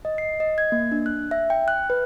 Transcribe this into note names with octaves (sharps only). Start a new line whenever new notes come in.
D#5
C7
D#5
G#6
A#3
D4
F#6
E5
G5
F#6
B4